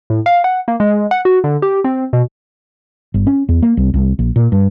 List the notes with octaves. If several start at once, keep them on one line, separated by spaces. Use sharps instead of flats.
A2
F5
F#5
A#3
G#3
F#5
F#4
D3
G4
C4
B2
G1
C#4
E2
A#3
C2
C2
A#1
A#2
G2